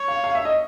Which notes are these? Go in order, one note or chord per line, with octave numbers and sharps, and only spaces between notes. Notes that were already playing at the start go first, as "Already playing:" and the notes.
Already playing: C#5
F5
F5
E5
D#5